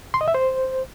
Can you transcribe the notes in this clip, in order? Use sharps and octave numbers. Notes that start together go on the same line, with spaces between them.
C6
D#5
E5
C5